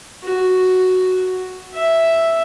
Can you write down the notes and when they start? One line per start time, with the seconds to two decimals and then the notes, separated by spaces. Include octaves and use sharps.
0.24 F#4
1.74 E5